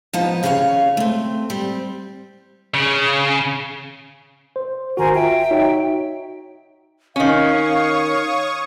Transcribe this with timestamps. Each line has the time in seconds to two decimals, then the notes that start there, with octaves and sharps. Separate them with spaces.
0.13 F3 B3 D#4 A5
0.43 D#2 C#3 G4 B4 C#5 F5
0.97 A3 C4
1.50 G3 C4
2.74 C#3
4.56 C5
4.97 G#1 D#3 F#4 A#4 C5 G#5
5.15 F4 E5 G5
5.51 D#4 F#4 C#5
7.16 D#3 C#4 C#5 F5 C#6 D#6